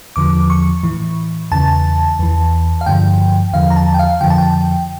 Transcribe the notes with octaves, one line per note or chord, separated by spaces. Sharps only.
E2 D3 F3 D6
C#6
A2 E3
E2 C#3 E3 A5
E2 E3
F5
G2 D3 F3 G5
E2 D3 F3 F5
A#5
A5
G5
F5
F2 D3 F3 G5
A5
G5